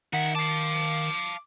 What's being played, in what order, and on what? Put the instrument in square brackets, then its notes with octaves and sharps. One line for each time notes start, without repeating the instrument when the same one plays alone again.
[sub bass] D#3 [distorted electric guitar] D#4 E5 [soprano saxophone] F#5
[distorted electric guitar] F5 A5 [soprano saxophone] D6